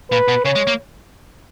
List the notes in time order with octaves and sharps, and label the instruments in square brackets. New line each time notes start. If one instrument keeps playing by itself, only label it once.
[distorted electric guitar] A#2 [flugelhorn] B4
[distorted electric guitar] B2
[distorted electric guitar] C#3 [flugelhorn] C#5
[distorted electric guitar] G#3
A#3